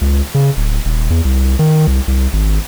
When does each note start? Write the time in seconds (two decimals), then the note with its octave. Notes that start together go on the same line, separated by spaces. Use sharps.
0.01 C#2
0.35 C#3
0.57 D1
0.85 D#1
1.10 E2
1.25 C2
1.59 D#3
1.87 C2
2.08 C2
2.33 G#1